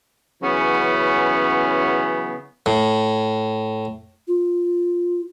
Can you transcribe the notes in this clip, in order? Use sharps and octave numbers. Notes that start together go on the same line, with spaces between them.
C#3 E3 F#3 B3 C#4
A2
F4